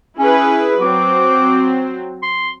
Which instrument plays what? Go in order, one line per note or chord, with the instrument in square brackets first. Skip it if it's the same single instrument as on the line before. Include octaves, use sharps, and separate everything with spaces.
[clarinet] C#4 [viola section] E4 G#4 B4
[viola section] F#3 C4 [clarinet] D6
[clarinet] C6